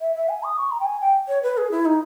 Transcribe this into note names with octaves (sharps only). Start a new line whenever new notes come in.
E5
E5
G#5
D#6
C#6
A#5
G5
G#5
G5
C#5
B4
G#4
E4
D#4